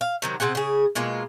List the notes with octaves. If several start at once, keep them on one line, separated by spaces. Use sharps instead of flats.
F5
C3 D#3 F#3
C3 C4 G#4 F#5
C#3 G#4
B2 G#3 A#3 F4